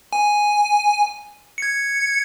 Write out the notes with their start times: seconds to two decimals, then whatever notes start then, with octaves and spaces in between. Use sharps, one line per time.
0.13 G#5
1.58 G#6 C#7